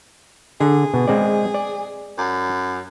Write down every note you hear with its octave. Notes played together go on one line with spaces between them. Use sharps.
D3 G#4
B2
G#3 C4 D5
D5
F#2